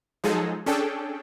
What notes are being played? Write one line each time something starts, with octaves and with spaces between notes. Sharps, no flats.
F3 F#3 G#3 D#4 G#4 A4
C#4 D4 G#4 A4 G5